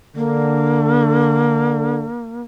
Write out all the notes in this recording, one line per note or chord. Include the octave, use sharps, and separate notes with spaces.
D3 A#3